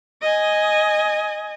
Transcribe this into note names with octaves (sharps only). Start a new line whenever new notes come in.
D#5 G#5